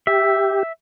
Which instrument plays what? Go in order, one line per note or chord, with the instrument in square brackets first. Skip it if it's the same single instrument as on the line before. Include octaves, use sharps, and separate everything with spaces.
[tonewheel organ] G4 [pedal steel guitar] E5